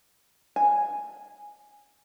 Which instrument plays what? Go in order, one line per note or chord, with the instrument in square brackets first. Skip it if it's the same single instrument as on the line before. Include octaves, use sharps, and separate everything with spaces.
[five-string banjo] G#5